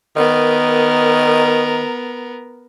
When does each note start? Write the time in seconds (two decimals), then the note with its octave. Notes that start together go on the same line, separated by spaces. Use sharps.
0.16 D#3 B3 A#4